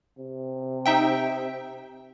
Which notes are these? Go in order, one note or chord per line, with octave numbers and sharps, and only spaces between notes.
C3
D#4 E5 G5